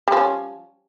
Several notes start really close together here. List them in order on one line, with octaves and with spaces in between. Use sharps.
G3 F3 C#4